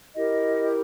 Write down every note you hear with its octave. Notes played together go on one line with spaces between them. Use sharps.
E4 G4 A#4 D#5